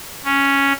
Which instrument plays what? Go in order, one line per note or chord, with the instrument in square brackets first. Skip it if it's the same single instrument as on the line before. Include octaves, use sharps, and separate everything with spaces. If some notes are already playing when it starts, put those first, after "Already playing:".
[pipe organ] C#4